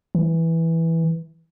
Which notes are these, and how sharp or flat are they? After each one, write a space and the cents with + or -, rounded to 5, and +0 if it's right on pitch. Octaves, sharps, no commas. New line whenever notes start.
E3 -5